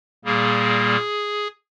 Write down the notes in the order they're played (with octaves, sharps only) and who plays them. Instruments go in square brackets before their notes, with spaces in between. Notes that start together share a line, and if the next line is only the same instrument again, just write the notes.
[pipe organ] A#2 G3 A#3 G#4